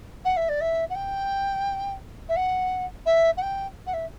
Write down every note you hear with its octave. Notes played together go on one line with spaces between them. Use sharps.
F#5
E5
D5
E5
F#5
G5
E5
F#5
E5
F#5
G5
F#5
E5